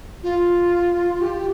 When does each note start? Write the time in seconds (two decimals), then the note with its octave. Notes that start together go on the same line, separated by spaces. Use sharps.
0.23 F4
1.21 G4